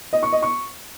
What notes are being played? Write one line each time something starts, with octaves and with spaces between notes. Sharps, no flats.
D#5
C#6
D#5
C#6